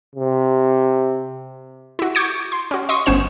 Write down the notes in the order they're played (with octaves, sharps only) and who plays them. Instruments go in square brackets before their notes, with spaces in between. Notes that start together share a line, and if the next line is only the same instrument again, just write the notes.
[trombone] C3
[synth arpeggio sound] E4 F#4
C#6 D6 G6 G#6 C#7 D7
C6
C#4 F#4
D#5 C6 C#6 D#6
G1 B3 C#4 C5 E7